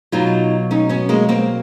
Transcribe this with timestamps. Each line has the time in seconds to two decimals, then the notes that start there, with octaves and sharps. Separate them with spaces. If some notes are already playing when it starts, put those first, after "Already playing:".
0.12 B2 F#3 D#4 F4
0.71 C#4 D#4
0.89 B3 C#4
1.09 G#3 A#3
1.29 A#3 C4